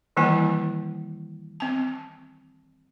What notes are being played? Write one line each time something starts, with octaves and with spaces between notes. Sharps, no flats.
D#3 E3 G3 A#3 E4 G#5
C4 A5